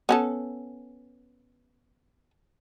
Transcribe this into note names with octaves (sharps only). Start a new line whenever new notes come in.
B3 C#4 A4